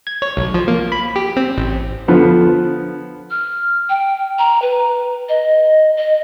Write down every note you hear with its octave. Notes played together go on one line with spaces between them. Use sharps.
G#6
C#5
B1
F3
A#3
B5
G4
C4
A1
D3 F3 B3
F6
G5
A#5
B4
D#5
D#5